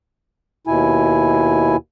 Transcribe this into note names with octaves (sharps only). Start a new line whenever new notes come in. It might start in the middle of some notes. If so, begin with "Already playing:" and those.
D#2 B2 E4 G#5